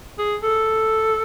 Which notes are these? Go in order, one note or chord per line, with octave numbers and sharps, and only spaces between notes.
G#4
A4